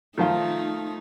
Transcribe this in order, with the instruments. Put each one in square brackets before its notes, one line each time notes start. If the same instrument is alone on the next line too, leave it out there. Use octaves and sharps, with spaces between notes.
[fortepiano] D#3 F3 F4 [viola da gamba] A3 D#4